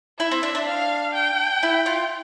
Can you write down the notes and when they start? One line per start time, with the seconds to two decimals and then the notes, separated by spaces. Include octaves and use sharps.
0.19 E4 E5
0.31 C4
0.43 D4
0.55 D4
0.67 F5
1.14 G5
1.63 E4
1.86 F4